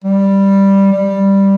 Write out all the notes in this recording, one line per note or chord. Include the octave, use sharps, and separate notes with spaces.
G3
G3